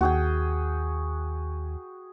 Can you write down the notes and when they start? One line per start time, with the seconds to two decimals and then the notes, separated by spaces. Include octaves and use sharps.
0.01 D#2 F#4 G#4 G5